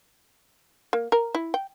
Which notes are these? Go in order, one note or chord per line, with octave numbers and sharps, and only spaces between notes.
A#3
A#4
E4
G5